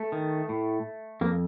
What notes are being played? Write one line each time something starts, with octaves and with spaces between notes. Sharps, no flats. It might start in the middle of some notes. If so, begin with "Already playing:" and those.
Already playing: A3
D#3
A2
F2 A#3